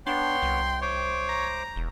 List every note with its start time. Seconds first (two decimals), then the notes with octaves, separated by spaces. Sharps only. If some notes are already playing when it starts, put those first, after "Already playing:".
0.07 B3 D4 C#5 G5 C6
0.42 C2
0.82 C5 C#5 D6
1.29 A#5
1.76 E1